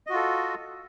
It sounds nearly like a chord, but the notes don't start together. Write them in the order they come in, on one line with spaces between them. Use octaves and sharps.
D#5 F#4 F4 A4